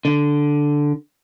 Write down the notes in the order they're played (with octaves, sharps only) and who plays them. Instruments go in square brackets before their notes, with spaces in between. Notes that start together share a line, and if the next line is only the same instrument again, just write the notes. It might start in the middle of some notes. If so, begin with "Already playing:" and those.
[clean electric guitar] D3